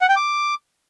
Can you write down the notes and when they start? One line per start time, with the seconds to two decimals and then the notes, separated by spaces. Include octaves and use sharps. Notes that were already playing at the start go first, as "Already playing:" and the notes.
0.01 F#5
0.09 G5
0.16 D6